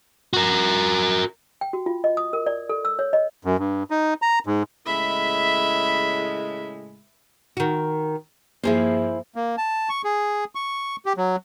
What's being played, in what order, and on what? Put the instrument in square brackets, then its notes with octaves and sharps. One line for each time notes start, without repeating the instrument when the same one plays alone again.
[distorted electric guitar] F#4 A#4
[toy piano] G5
F#4
F4
D#5
D#6
A#4
D5
A4
E6
C#5
D#5
[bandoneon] F#2
G2
D#4
A#5
G#2
[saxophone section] A2 C#3 G#3 [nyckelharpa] E5 B5
[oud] D#3 F#4
[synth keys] G2 F3 A#3 [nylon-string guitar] E4 G#4 C5
[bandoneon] A#3
A5
C#6
G#4
C#6
G4
F#3